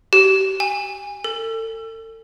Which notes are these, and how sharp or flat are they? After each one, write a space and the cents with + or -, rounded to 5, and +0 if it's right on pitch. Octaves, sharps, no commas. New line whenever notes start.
G4 -35
G#5 -25
A4 +35